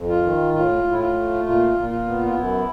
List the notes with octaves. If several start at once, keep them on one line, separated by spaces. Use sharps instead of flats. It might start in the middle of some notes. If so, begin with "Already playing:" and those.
Already playing: F2
F4
D#3
A2 F4
A2
E4
F4
A3
A#2 F4
A#2
F4
B3
F4
F#2 E4